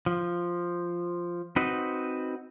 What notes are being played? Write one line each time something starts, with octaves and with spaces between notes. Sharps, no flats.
F3
C4 D#4 F#4 B4